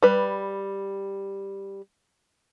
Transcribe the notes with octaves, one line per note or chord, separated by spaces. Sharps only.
G3 B4